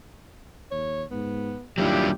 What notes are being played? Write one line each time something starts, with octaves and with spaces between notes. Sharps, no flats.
D#2 C#5
G#2 B3
D#2 F#3 G3 D4 E4 F4 G4